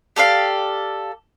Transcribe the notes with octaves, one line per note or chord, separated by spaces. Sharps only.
G4 A4 D5 F5